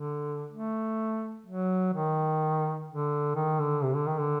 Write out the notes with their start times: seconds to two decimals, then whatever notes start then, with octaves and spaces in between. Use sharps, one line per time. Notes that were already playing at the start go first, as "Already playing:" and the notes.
Already playing: D3
0.51 A3
1.46 F#3
1.93 D#3
2.88 D3
3.35 D#3
3.59 D3
3.83 C3
3.95 D3
4.07 D#3
4.18 D3